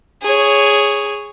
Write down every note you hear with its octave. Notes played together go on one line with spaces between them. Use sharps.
G#4 C#5